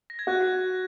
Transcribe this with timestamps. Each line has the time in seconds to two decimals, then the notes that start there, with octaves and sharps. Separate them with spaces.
0.10 A#6
0.19 G#6
0.27 F#4 F#6